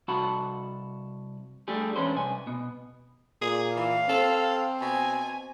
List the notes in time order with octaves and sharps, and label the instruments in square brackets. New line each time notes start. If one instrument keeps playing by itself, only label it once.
[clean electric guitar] C2 F#4 F#5 A5 B5
G3 A3 D4 G4 G#4
E2 G#3 C#4 D4 B4 C5
C2 G#5
B2 B3
[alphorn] A#2 [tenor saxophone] G#4
[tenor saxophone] E3 [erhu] F5
[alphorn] C4 [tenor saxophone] A4
[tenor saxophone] B2 [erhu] G#5